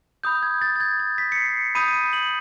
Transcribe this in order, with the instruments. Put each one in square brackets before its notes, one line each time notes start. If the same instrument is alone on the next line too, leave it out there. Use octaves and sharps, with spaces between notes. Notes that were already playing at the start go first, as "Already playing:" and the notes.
[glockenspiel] B5 D#6 G6
G#6
A6
A6
G#6
A6
B6
C#7
C7
B5 D#6 G6 D#7
D#7
F#7